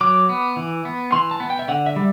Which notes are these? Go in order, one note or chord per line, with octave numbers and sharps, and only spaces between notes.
F#3 D6
B3
E3
B3
E3 C6
A5
B3
G5
E5
D3 F#5
E5
G3